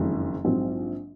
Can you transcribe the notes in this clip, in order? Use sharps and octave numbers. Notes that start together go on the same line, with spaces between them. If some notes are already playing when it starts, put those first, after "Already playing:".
Already playing: F#1 F2 D#3 G#3 C#4
A#1 G#2 F#3 C4